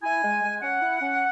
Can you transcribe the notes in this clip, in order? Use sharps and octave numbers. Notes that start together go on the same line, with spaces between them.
E4 G#5
G#3
G#3
C#4 F#5
E4
C#4